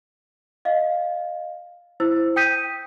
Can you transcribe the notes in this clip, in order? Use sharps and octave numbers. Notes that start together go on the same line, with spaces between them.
D#5 F5
E4 C5 E6
G5 D#6 G6 B6 D#7